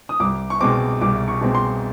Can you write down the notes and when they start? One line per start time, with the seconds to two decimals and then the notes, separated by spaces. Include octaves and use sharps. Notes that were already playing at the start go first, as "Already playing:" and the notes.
0.09 D#6
0.20 C2 D6
0.50 C#6
0.61 B2 G#3 C4 D6
1.01 C2 D6
1.28 C#6
1.41 B2 G#3 C4
1.55 C6